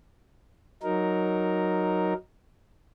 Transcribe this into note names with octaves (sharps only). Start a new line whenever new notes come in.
F#3 D#4 A#4